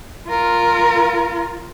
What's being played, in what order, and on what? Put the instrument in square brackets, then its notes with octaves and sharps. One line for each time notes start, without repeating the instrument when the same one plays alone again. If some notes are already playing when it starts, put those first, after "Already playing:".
[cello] F4 A#4